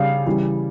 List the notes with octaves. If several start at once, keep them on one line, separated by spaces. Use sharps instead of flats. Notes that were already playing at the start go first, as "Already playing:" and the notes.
Already playing: C#3 G3 F5
C#3 E3 G3